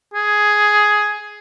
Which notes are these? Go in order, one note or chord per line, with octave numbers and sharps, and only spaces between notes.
G#4